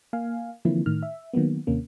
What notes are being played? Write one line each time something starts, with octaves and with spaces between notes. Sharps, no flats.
A#3 F5 G#5
D3 E3 F3 A#3 C4 E4
A2 D#3 F6
E5
D#3 F#3 A#3 B3
D#2 C3 A#3 C#4